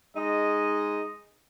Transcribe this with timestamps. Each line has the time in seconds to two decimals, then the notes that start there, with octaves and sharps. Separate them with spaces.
0.15 G#3 D#4 D#5